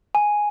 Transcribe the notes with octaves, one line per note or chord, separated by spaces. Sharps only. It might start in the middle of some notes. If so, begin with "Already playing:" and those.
G#5